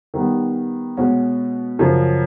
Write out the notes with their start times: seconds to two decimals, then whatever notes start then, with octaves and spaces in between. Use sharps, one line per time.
0.14 D#3 G3 B3
0.97 B2 G#3 C#4 F#4
1.79 F#2 C#3 F3